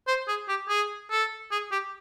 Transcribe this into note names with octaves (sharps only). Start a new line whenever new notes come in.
C5
G#4
G4
G#4
A4
G#4
G4